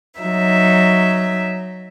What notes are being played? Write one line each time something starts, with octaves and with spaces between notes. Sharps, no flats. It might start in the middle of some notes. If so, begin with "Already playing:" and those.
F#3 D#4 E5